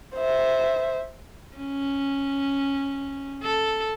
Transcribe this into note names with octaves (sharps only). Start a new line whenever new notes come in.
C5 E5
C#4
A4